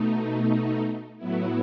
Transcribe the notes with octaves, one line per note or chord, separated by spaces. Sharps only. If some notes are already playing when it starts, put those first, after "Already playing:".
Already playing: B2 A3 D#4
A2 F#3 B3 E4